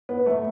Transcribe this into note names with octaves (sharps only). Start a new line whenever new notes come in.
B3
A3